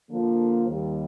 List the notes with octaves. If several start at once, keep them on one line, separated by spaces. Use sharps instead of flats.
D3 F3 A#3
D#2 D#3 G3